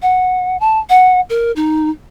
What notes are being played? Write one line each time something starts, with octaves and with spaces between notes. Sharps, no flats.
F#5
A5
F#5
A#4
D#4